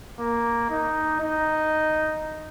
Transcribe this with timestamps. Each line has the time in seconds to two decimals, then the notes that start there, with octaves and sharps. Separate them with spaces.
0.20 A#3
0.70 D#4
1.21 D#4